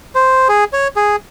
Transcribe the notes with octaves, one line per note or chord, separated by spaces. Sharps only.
C5
G#4
C#5
G#4